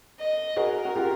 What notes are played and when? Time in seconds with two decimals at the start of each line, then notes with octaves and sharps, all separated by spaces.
0.19 D#5
0.57 F#4 G#4 A#4
0.85 F#4
0.96 F4 G4